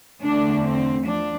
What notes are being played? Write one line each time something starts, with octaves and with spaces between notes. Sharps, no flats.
E2 D3 A3 D4
C4
F3 D4